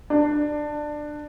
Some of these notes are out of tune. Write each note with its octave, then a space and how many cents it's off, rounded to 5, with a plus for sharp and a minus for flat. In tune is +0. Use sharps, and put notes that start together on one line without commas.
D4 +15